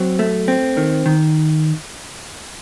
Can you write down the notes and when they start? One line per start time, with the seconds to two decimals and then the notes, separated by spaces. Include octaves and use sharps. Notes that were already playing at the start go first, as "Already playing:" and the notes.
Already playing: F#3 C4
0.19 A3
0.48 C4
0.77 D#3
1.06 D#3